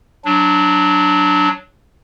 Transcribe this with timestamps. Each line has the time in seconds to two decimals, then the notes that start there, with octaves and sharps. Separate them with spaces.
0.25 F#3 D4